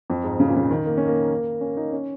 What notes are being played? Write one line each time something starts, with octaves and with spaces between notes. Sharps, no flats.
F2
G#2
C#3
A#2
C#3
D#3
A#3
C#4
A#3
C#4
D#4
C#4